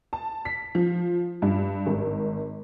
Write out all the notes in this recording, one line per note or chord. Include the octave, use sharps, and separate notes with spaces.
A5
B6
F3
G2
G#1